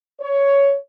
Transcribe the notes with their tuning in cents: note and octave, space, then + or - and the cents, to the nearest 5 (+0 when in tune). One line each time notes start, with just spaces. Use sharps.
C#5 +10